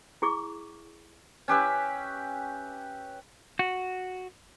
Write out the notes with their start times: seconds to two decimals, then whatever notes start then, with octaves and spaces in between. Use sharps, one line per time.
0.22 E4 G#4 C#6 D6
1.48 C#4 G4 B4 E5
3.59 F#4